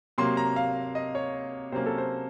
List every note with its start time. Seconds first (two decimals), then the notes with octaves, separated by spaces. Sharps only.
0.18 C3 F#3 A#3 C6
0.37 A#5
0.56 F5
0.95 D#5
1.15 C#5
1.72 C3 F#3 A#3 C#4 C5
1.86 A4
1.98 C5